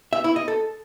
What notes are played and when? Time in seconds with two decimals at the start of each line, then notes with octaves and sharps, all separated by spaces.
0.13 E5
0.24 E4
0.36 D#5
0.48 A4